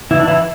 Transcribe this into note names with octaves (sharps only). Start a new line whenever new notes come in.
E3 E4
D4
E3 E4